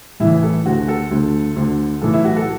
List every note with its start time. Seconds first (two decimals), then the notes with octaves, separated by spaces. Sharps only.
0.20 A1 A2 E3 E4
0.43 A4
0.66 D2 D3 F#4
0.88 A4
1.11 D2 D3
1.56 D2 D3
2.02 B1 A2 E3 A4
2.13 E4
2.25 F#4
2.36 A4